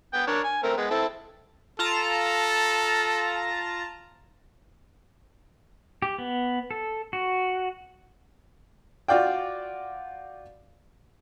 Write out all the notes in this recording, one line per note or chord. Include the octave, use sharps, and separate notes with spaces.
B3 G5
D4 A#4 C#5
G#5
A3 C4 A#4
G#3 B3
C4 E4 A4
F4 A4 A5 A#5
G4
B3
A4
F#4
F4 F#4 D5 F5 G5